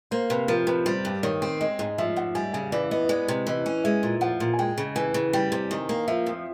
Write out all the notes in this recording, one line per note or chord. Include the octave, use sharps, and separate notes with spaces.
A#3 C5
C3 B4
F3 A#4
C3 B4
G3 C5
G2
D#3 C#5
C4
G#3 D#5
G#2 D#5
F3 E5
G#2 F#5
G3 G#5
C#3 G#5
E3 D5
B3 D#5
D#5
G#3 D5
C3
E3 D#5
C#4
G#3 E5
A#2
F3 F#5
A#2
G#5
G#3 G5
C#3
E3 G#5
C#3
G3 G5
C3
D#3
A#3
F3 E5
F2